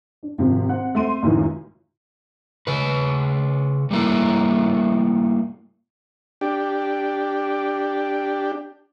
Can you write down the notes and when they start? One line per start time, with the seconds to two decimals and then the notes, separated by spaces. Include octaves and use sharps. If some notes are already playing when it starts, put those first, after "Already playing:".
0.23 D4
0.38 G#1 C3 F3
0.68 C4 F#5
0.95 A3 C4 C6 D#7
1.22 C#2 F#2 A2 D#3 E3
2.67 C#3 B4
3.91 G3 A3 A#3 E4
6.41 D4 G4